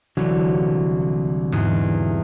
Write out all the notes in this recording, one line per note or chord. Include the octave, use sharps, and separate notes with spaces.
C2 D3 E3 F#3
E2 G#2